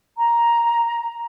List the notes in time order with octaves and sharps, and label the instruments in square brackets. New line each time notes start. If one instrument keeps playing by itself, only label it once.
[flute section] A#5